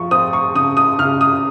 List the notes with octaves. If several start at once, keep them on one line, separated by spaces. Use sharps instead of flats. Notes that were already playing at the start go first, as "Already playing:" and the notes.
Already playing: F3 C#6
C4 D#6
C#6
C#3 D#6
D#6
C#3 F6
D#6